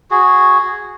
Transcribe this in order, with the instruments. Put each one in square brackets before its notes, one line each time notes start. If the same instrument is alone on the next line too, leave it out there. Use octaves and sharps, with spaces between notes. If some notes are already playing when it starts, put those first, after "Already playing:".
[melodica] F#4 G#4